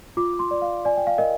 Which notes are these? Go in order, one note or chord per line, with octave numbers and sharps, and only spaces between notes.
F4 D6
C6
D5
F5
D5 G#5
G5
F5
A#4 D#5